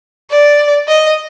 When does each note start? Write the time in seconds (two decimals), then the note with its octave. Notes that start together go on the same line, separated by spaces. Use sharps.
0.31 D5
0.89 D#5